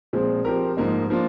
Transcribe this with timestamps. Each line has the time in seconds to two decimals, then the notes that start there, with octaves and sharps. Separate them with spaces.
0.13 A#2 F3 G#3 C4
0.45 F3 C4 G4 A#4
0.77 G#2 F3 A#3 D#4
1.10 F3 A#3 D4 F4